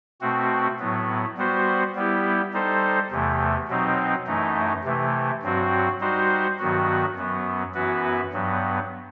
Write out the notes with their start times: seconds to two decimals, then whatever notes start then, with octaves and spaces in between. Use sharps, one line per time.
0.21 B2 A3 C4 F#4
0.79 A2 F#3 B3
1.37 G3 B3 F#4 C5
1.95 G3 B3 E4 G4
2.53 G3 D#4 A4 C5
3.11 E2 C3 E3 A3
3.68 B2 F#3 C4 D#4
4.27 F#2 E3 A3 D#4
4.84 C3 E3 A3
5.42 G2 F#3 C4 F#4
6.01 G3 D#4 F#4 C5
6.59 G2 D#3 F#3 B3 F#4
7.16 F#2 F#3 B3
7.74 F#2 E3 B3 F#4 B4
8.33 G2 F#3 B3